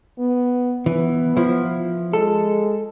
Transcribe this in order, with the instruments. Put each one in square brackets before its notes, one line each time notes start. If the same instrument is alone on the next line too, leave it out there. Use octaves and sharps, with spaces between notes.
[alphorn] B3
[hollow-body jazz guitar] E3 [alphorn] B3
[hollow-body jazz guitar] F3 E4
[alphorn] G#3 [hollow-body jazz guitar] A4